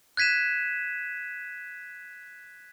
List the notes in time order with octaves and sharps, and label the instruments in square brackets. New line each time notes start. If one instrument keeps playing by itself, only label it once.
[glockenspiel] F#6 G#6 B6 D#7 E7